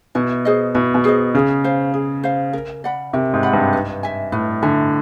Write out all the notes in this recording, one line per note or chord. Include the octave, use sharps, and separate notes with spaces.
B2 E4
G#4 C5 D#5
B2 E4
B2
G#4 C5 D#5
C#3 G#4
C5 F5
G#4
C5 F5
A#4
D5 F#5 B5
C3 A#4
G#2
D5 F#5 B5
G2
B4
E5 G#5
A2 B4
D3 E5 G#5